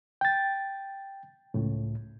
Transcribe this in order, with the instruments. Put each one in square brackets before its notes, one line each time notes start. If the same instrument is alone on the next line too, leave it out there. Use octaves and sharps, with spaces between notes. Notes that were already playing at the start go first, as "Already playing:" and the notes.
[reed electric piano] G5 A6
C#2 A2